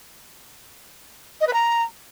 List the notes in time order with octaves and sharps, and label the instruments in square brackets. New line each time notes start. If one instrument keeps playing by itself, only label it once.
[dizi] D#5
B4
A#5